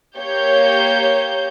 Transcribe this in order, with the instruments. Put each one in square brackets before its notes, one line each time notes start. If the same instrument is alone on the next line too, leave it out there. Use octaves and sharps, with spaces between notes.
[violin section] A#3 G4 C#5 G6